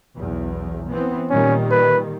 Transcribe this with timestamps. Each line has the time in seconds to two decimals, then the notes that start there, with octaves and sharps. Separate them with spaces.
0.17 B1 E2
0.89 E3 B3 C4
1.30 A#2 D#3 G3 C#4
1.71 B4